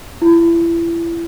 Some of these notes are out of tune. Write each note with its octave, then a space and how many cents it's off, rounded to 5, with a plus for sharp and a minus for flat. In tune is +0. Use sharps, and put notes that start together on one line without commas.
E4 +30